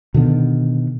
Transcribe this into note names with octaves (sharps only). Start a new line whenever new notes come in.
B2 D3 D#3 B3